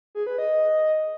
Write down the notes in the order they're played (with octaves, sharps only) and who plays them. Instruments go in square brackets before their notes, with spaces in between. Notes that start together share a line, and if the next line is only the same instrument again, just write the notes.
[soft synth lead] G#4
B4
D#5